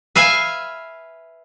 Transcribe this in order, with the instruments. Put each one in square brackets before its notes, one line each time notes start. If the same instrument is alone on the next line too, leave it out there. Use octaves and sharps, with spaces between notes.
[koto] B4 E5 F5 G#5